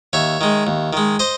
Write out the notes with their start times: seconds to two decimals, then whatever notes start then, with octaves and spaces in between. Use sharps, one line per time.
0.13 D#2 C#5 E5
0.41 D#3 G#3
0.67 D#2
0.93 D#3 G#3
1.19 C5 D#5